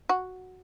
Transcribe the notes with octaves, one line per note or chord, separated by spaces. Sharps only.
F#4